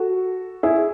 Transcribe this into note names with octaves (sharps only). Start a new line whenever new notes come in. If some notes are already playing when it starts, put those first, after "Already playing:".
Already playing: F#4 A4
E4 G#4